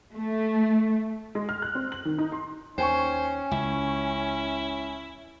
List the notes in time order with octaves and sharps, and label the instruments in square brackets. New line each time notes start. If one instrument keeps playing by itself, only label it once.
[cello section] A3
[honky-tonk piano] G#3
F6
F#6
C4
F#7
D#3
D#4
C6
[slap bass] D#2 [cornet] C#4 [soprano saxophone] C5 [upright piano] G5 G#5 C#6
[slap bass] C#2 [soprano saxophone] E4